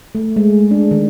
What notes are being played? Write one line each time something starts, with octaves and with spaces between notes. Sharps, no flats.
A3
G#3
D4
D#3